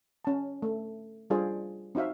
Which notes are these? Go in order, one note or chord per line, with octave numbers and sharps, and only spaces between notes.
C#4 A5
A3
G3 D4 F4 G#4 C5 D5
C4 D#4 F#4 E5 F5